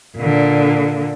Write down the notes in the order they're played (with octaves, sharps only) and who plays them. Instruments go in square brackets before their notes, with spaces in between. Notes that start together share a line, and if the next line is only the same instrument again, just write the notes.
[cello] A#2 D3